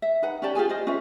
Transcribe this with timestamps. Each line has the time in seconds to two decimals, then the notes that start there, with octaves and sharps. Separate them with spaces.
0.02 E5
0.22 D#4 B4 F#5
0.42 C#4 G4 D5 A5
0.55 F4 G4 G#4 G#5
0.69 C5 D#5
0.87 C#4 F4 B4 E5